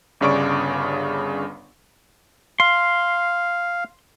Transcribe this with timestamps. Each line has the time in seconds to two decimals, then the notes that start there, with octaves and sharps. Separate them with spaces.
0.21 G1 G2 C#3 D5 C#6 D7
2.60 F5 C6